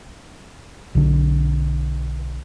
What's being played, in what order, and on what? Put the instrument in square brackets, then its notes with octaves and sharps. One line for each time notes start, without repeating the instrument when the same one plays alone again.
[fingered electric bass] B1 D3